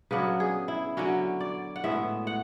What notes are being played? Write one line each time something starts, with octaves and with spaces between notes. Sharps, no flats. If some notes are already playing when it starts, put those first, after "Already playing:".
C#3 F#3 B3 D4 B4
G#4
E4
D3 F#3 C#4 F#4
D5
F#5
A2 G#3 B3 E5
F#5